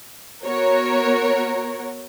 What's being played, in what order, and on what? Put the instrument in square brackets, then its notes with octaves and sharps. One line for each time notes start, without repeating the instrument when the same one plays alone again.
[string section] B3 F#4 A#4 C#5